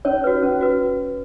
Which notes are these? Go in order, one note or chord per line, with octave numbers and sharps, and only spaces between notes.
C#4 C#5
F#4 B4
C#4
F#4 B4